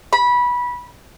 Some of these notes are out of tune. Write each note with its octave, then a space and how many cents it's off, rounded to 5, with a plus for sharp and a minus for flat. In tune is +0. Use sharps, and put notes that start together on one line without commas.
B5 -20